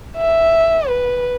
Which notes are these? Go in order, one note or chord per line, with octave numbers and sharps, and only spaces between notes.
E5
B4